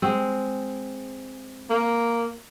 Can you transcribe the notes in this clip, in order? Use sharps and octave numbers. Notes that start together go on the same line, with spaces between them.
G#3 C4
A#3